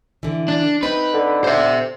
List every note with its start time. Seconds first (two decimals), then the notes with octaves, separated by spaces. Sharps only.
0.23 D3 E3
0.48 D4
0.83 C4 D#4 B4
1.14 D3
1.44 C5 E5